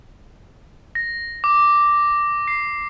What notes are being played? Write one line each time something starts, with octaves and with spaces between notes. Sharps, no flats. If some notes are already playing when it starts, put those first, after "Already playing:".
A#6
D6
C7